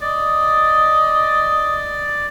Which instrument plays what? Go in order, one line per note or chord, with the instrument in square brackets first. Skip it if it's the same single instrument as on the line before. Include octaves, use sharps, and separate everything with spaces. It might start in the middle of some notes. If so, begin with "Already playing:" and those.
[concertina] D5 [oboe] D#5